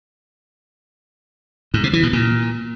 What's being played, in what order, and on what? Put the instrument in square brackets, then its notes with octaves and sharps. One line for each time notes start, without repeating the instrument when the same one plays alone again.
[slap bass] G#2
C3
E3
B2
A#2